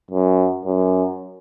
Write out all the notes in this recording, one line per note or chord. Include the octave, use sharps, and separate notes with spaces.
F#2
F#2